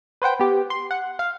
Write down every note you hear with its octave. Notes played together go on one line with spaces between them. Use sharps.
B4 C5 F#5 G5
B3 G4
C6
F#5
F5